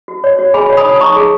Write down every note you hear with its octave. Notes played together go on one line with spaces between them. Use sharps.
F#4
C#5
F#4
G#4 G#5 B5
C#5
B5 D#6
D#4
D#6
D#4 A#5 C#6
G#4